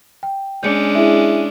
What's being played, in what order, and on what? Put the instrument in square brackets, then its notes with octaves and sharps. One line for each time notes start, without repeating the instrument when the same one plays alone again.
[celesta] G5
[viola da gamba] G#3 C#4 D4 [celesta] G6 C#7
[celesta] E4 G#4 E5